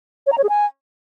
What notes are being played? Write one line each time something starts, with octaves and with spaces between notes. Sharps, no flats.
C#5
A#5
C#5
G#4
G#5